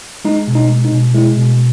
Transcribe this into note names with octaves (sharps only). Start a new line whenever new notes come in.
G#3 D#4
B2
D#4
G#3
D#4
B2
G#3 E4
B2